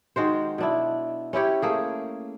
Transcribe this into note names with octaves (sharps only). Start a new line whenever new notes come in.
D#3 G#3 F#4 C5
B2 D4 E4
C#4 E4 G4 C#5
A3 A#3 G#4